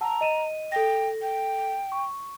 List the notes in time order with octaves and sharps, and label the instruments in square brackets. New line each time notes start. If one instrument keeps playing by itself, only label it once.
[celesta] F#5 A5 E6 [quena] A#5
[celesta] D#5 D#7 E7
[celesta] A4 A#6 [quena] G5
[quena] G5
[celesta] C#6